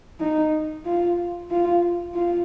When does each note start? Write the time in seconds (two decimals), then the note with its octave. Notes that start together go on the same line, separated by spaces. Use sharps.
0.20 D#4
0.85 F4
1.50 F4
2.14 F4